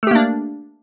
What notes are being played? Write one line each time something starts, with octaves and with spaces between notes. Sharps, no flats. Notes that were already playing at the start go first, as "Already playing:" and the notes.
A3 A#3 D4 G4